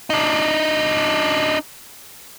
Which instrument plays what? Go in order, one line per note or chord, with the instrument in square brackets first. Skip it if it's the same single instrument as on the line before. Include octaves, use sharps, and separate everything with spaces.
[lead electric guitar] D4 D#4